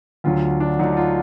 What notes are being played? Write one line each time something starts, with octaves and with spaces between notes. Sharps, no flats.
D2 D3 F#3 F4
D4
D2 D3 F#3 D#4
F4